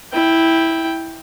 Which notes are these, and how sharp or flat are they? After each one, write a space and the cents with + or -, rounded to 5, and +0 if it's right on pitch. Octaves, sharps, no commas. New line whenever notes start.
E4 -10 G5 +5